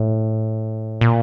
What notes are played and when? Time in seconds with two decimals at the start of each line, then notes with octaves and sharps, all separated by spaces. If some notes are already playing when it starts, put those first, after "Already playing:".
Already playing: A2
1.01 A#2